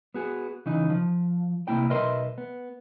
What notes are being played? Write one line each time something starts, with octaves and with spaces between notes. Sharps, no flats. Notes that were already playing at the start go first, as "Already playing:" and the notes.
B3 F#4 G#4
C#3 E3 D#4
F3
C2 C3 G#3 A#3 E4 G5
B1 A#4 B4 D#5 E5 C6
B3